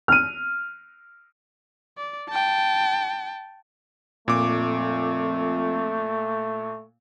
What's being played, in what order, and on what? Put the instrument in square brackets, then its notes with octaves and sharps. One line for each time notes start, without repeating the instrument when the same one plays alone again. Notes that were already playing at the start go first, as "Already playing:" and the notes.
[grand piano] F6 D#7
[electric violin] D5
G5 A5
[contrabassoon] F2 [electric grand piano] A#2 D6 [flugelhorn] A3